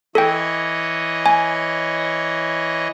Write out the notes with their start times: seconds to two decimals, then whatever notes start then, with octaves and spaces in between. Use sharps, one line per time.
0.15 E3 A4 C#5 D#5 G5
1.26 G#5